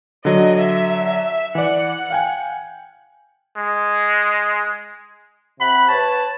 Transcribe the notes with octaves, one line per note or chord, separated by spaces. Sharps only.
D3 F#3 D#5
E5
E3 D5 F#5
F5 G5 G#5
G#3
C3 F#5 B5
B4 C#5 A5